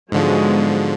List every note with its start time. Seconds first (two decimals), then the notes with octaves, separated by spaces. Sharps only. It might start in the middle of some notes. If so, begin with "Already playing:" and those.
0.12 G#2 D3 F3 F#3 G#3 B3